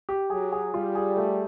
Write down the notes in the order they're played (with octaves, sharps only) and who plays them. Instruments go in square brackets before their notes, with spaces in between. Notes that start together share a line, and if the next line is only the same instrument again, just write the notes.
[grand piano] G4
[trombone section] F#3 [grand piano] G#4
[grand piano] G#4
[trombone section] G3 [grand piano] F4
[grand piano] G#4
A3